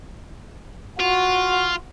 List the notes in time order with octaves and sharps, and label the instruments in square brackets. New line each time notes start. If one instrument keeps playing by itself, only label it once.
[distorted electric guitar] F4 [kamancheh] F#4